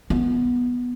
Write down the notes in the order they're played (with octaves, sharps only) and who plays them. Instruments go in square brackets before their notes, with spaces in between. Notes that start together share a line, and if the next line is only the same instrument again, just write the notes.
[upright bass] B3